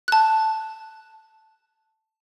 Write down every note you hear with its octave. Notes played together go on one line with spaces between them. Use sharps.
A5 F#6